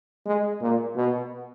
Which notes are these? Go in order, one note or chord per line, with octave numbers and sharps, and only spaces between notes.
G#3
A#2
B2